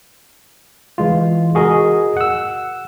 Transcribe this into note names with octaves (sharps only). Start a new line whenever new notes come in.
E3 G#3 F4
F#4 G#4 A#4 D#5
F#5 E6